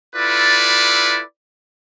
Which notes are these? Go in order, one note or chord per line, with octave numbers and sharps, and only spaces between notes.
E4 F4 A4 B4 D5